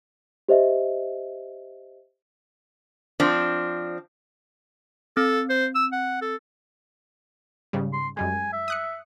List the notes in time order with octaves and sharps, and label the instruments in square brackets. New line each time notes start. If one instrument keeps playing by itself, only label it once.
[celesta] G4 C5 D#5 E5
[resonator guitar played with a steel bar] F3 C4 D4
[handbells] C4 [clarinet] A4
[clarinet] C5
E6
F#5
A4
[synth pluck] G#2 C#3 G3
[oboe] C6
[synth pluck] F#2 G3 G#3 [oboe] G#5
[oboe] E5
[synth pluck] D#6 F#6 C#7